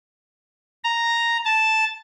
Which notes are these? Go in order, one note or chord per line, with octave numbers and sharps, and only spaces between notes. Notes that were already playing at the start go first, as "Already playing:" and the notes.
A#5
A5